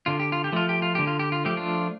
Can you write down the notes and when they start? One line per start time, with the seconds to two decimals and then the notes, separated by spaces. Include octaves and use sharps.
0.06 D3 F4
0.20 G4
0.32 F4
0.44 G4
0.52 F3 A3 F4
0.69 G4
0.82 F4
0.95 D3 G4
1.07 F4
1.19 G4
1.32 F4
1.45 F3 A3 G4
1.57 D4 F4